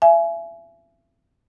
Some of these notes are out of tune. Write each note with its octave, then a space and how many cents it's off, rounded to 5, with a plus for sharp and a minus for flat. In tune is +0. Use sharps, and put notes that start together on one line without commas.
E5 +35 G#5 +20